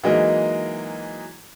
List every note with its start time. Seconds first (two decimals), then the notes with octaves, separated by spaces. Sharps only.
0.04 E3 F#3 G#3 A#3 D#4